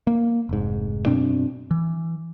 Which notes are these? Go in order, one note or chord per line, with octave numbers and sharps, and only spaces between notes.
A#3
F1 G#2
F#2 B2 C4 D4
E3